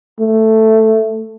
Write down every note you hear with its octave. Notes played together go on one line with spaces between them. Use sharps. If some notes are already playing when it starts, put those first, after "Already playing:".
A3